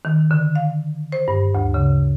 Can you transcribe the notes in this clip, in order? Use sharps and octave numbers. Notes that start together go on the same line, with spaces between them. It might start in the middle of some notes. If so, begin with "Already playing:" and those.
D#3
D3
F5
C5
G2
D2
C#3